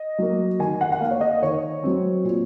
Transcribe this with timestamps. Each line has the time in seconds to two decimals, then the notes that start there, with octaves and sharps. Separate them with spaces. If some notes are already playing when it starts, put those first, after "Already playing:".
Already playing: D#5
0.18 F#3 A#3
0.59 D#3 G#5
0.81 F#5
0.92 F#5
1.01 A#3 F5
1.11 C#5
1.21 D#5
1.42 D#3 C#5
1.83 F#3 C4
2.24 A#2